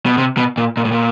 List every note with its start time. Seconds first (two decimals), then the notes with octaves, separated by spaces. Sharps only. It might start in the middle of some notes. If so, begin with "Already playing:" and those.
0.06 B2
0.18 C3
0.37 B2
0.58 A#2
0.77 A#2
0.85 A2
0.92 A#2